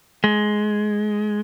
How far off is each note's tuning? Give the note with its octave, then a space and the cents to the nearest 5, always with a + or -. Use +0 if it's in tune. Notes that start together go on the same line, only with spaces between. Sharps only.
G#3 +15